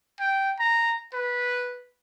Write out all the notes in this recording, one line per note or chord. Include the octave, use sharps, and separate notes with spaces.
G5
A#5
B4